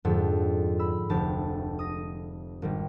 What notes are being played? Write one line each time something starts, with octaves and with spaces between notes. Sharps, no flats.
F2 G#2 D3 A4
B5 E6
F1 D2 G4 A5
D#6 A#6
G#1 D#3 G3